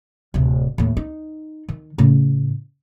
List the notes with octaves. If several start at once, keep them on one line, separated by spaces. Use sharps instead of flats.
D1 C3
D#2 A2
D#4
D#3
A2 C#3